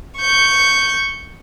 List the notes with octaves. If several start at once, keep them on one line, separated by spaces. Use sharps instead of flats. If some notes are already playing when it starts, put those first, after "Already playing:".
C#6 G6